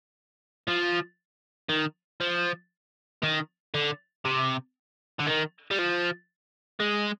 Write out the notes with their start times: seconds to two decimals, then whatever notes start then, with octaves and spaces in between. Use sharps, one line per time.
0.68 F3
1.69 D#3
2.21 F3
3.23 D#3
3.74 D3
4.25 C3
5.20 D3
5.27 D#3
5.71 G3
5.79 F3
6.80 G#3